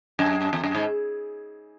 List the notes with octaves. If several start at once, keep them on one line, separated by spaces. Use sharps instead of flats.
F#2
E2
F#2
G#2